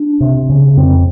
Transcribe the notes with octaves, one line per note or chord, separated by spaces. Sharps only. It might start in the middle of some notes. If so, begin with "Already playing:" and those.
Already playing: D4
C3
C#3
F2 C4